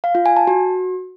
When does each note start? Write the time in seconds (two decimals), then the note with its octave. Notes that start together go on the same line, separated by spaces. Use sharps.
0.04 F5
0.15 F4
0.26 G#5
0.37 A5
0.47 F#4